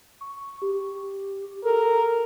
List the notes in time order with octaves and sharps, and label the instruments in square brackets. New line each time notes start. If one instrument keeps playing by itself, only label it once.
[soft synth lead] C#6
G4
[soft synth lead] A4 [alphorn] A#4